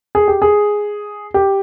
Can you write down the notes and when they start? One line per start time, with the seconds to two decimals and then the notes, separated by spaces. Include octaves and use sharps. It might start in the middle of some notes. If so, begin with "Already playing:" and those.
0.15 G#4
0.28 G4
0.42 G#4
1.34 G4